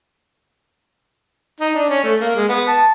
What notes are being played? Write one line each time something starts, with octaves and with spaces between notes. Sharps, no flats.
D#4
D4
C#4
A3
A#3
G#3
B3
A5